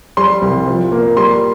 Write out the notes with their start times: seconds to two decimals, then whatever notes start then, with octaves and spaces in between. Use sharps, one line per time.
0.17 G3 C6
0.42 C2
0.67 F3
0.92 A#3
1.17 G3 C6